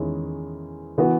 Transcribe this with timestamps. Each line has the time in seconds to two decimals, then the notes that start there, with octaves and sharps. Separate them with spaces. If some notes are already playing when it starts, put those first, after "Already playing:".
Already playing: E2 D#3 G#3 C#4 E4
0.98 E3 B3 F#4